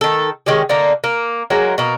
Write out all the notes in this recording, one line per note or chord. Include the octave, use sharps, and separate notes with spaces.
D#3 A4
D#3 G#3 C#4 G4
D3 A#3 D#4
A#3
F#3 G#3 A#3
B2 A#3